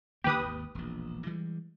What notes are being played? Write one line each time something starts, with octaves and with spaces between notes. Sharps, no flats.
D3 D#3 A#3 G4 B4 D#6
G#1 D#2
E1 A#1
E3 G3 G#3